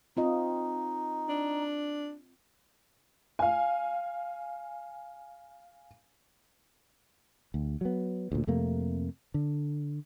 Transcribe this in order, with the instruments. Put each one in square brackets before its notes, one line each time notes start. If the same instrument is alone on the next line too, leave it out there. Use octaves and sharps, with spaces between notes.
[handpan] C4 F4 D#5 [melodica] D#4
[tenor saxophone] D4
[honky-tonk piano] F5 G#5
[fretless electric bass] D2
F#3 B3
D2 A#2
F2 C3 A3 A#3
D3